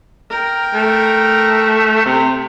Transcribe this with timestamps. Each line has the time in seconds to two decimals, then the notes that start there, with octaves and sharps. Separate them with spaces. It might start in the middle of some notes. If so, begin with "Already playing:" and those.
0.30 A#4 G5
0.74 A3
2.06 C3